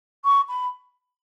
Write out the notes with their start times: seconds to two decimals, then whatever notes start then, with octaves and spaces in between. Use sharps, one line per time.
0.24 C#6
0.48 B5